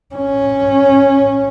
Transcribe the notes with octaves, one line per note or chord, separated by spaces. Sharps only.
C#4